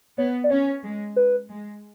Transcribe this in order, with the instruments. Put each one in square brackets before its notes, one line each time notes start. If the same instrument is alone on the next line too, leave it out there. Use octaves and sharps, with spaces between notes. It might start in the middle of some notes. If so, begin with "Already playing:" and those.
[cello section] B3 [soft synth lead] C#5
[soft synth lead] D5
[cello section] C#4 [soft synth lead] C#5
[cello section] G#3
[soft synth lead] B4
[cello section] G#3